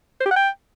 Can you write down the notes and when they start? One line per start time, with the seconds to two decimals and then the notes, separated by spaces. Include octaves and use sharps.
0.21 C5
0.26 G4
0.31 F#5
0.36 G5